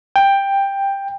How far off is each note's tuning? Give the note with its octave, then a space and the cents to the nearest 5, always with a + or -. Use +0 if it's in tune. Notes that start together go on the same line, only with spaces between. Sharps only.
G5 +10